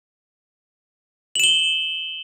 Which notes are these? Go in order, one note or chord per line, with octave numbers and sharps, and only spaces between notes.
E7 F#7 G7